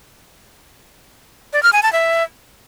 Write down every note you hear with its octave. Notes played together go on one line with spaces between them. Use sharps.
D5
F6
G#5
A5
E5